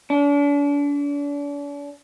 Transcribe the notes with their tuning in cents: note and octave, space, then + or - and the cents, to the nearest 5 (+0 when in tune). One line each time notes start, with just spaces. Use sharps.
D4 -40